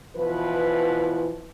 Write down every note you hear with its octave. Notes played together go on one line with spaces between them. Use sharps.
B2 E3 F3 E4 B4